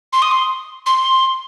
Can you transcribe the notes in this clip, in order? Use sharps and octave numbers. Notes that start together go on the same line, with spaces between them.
C6
D#6
C6
C6